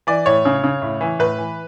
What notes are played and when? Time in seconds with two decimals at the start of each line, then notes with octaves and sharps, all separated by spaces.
0.07 E3 D5
0.26 A2 C#5
0.45 C#3
0.64 C#3
0.82 A2
1.01 E3
1.19 A2 B4
1.38 E3